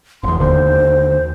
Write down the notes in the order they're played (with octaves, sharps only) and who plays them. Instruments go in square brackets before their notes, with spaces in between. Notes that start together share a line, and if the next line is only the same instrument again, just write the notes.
[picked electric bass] F1 E2 [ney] C6
[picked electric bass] D#2 D3 [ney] C5